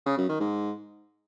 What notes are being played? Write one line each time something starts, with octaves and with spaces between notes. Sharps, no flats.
C#3
F#2
D#3
G#2